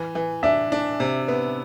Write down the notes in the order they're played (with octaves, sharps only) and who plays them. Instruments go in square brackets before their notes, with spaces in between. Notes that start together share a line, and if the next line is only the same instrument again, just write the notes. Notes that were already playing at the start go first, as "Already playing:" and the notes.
Already playing: [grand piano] E3
E3
[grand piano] D4 [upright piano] E5
[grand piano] D4
C3
B3